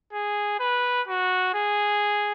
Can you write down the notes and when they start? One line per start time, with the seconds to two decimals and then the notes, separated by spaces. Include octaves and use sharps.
0.13 G#4
0.60 B4
1.08 F#4
1.54 G#4